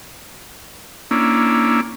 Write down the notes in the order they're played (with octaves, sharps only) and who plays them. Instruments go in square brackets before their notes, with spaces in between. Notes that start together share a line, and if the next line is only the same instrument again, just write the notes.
[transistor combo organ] A#3 C#4 D4 E4